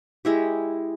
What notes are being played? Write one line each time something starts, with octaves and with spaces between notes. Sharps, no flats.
G#3 E4 G4